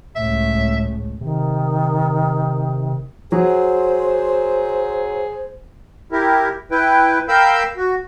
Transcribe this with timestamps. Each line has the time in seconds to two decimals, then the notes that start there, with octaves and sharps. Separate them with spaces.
0.16 C#2 A2 E5
1.21 C3 D#3
3.32 F#3 G#4 C5
6.12 E4 G4 A#4
6.71 E4 B4 G5
7.28 A#4 F5 G5 B5 E6 G6
7.77 F#4